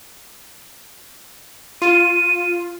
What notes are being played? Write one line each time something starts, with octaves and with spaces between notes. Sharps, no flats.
F4 D#7